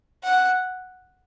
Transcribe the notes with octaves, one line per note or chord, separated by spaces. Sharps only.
F#5